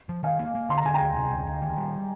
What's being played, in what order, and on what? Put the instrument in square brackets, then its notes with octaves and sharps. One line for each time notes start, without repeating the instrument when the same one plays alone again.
[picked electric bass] F3
[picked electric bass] D#3 [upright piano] F5 G#5
[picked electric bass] A#3
A#3
[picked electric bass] D3 [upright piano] C6
[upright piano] A#5
[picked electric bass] D3 [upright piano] G#5
[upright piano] G5 A#5
[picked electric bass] D2
C3
D2
D2
D#3
G3